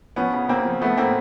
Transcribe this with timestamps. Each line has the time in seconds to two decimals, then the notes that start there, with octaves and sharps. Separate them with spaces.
0.16 F3 B3 C#4
0.33 C#3
0.49 C#3 A#3 C4
0.65 F3
0.81 F3 A3 B3
0.98 A2 A#3 C4